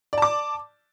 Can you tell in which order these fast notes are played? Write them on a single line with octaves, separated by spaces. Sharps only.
D5 A5 D6